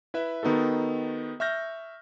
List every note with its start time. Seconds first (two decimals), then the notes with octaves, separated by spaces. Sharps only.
0.14 E4 B4 E5
0.43 D#3 B3 D#4 F#4 A4
1.40 E5 C#6 F6 G6 A#6